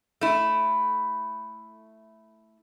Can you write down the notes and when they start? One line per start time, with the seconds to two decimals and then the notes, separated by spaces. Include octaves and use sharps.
0.21 A3 E4